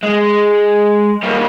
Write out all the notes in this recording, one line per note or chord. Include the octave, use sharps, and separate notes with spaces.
G#3
G3 A#3